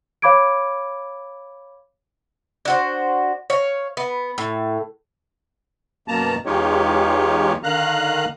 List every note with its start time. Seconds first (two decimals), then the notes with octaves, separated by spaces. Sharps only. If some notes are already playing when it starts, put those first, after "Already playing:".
0.22 C#5 F5 B5 D6 G#6 D7
2.65 D4 F#4 C5
3.50 C#5 F5
3.97 B3
4.38 A2
6.08 F#2 B2 A#3 A5 A#5
6.46 E2 G#3 D#4 F4 G4 C#5
7.63 D3 D#3 F5 A#5 F#6